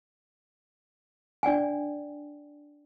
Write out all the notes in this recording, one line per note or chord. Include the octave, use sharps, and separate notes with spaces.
D4 D5 G5 G#5